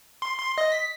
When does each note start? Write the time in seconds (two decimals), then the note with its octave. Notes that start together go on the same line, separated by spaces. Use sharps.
0.22 C6
0.38 C6
0.58 D#5
0.72 B6